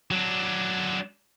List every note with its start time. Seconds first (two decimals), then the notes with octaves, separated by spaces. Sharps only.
0.11 F#3 D4